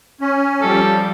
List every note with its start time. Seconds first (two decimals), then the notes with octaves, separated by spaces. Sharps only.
0.21 C#4
0.61 F3 G3 A4